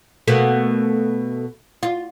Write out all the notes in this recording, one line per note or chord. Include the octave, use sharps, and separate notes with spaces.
B2 A3 A#3
F4